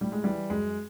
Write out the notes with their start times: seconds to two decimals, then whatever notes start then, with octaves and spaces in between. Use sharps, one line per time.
0.01 A2 G3
0.12 G#3
0.24 E3 G3
0.50 F#2 G#3